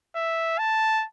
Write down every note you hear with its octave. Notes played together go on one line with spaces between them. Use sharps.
E5
A5